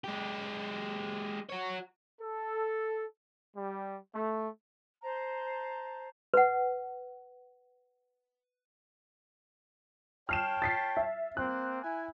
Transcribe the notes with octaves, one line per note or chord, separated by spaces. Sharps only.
G#3 G4
F#4 C#5
A4
G3
A3
C5 A5 A#5
B4 F#5
C#5 G5 A5 F6 C7 E7
A6 B6 C7
E5
A#3 C4 F#6
E4 G#5